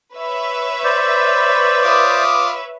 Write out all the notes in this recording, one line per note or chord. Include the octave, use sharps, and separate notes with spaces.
B4 C#5 E5
C5 D5
F4 D6 D#6